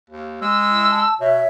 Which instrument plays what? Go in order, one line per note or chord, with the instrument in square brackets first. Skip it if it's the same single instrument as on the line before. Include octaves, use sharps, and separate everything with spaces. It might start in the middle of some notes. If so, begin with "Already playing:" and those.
[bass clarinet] D#2
[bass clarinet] G#3 [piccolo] E6
[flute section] E4
A5
[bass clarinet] B2 [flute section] C#5 E5